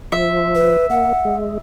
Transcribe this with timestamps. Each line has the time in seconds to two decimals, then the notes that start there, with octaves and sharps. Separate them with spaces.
0.12 F3 E5
0.55 B4
0.90 A#3 F#5
1.25 G#3